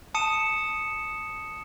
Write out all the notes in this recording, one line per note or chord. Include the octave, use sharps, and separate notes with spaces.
A5 D#6 C#7 D#7 E7